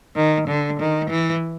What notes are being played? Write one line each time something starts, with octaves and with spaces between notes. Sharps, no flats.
D#3
D3
D#3
E3